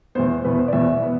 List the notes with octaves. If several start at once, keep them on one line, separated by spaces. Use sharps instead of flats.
E2 B2 B3 C5
E2 B2 B3 B4
C5
D5
E2 B2 B3 E5
B3